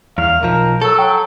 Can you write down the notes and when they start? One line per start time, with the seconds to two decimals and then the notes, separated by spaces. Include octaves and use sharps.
0.18 E2 F5
0.42 B1 F3 A#4
0.82 F#3 A4 E6
0.99 F#3 G5